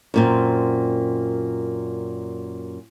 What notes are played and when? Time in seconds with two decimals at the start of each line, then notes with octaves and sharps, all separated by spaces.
0.14 F#2 A#2 C4